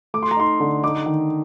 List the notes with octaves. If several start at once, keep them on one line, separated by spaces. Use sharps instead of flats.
A3 D6
C6
A#5
D#4 C6
D3
D#4 D6
D#3